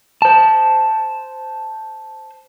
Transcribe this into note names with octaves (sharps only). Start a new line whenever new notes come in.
C5 A5